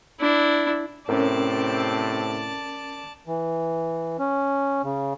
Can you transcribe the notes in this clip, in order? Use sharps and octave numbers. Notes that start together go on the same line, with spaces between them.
D4 E4
A2 C3 C4 C#4 A#4 D5 A5
E3
C#4
C#3